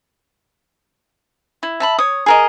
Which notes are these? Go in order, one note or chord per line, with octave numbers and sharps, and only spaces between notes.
E4
E5 A5 B5
C#5 D#6
G#4 A#4 D#5